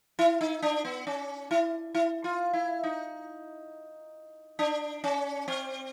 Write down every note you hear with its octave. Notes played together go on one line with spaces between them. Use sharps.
E4
D#4
D4
B3
C#4
E4
E4
F4
E4
D#4
D4
C#4
C4